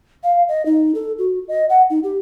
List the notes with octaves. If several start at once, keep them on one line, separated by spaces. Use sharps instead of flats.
F5
D#5
D#4
A4
F#4
D#5
F#5
D#4
G4